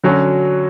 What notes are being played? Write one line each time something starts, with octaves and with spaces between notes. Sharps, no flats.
D3 F#3 C#4 F#4